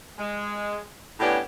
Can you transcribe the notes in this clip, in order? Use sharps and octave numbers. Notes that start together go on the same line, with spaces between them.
G#3
A2 B3 C#4 D4 G4